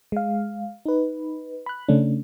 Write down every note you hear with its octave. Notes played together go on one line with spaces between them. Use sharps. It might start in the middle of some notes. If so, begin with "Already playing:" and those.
G#3 F5
D#4 B4
B5 F#6
C#3 A3 C#4 D4